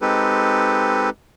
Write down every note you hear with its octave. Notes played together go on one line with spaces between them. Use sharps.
G#3 C4 D#4 G4 A4 B4